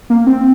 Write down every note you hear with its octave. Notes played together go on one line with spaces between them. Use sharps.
A#3
C4